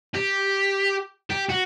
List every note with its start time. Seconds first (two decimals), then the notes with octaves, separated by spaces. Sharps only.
0.14 G4
1.30 G4
1.49 F#4